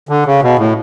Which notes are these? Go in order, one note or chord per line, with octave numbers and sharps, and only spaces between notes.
D3
C#3
B2
A2